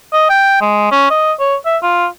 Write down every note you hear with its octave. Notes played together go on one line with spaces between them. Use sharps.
D#5
G5
G#3
C#4
D#5
C#5
E5
F4